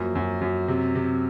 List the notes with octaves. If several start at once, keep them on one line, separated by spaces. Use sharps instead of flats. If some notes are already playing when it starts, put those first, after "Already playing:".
Already playing: F#2 F3 A#3
F#2
F#2
C3
C3